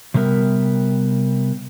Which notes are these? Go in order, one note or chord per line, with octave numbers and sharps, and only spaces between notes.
C3 G3 B3 A#4 E5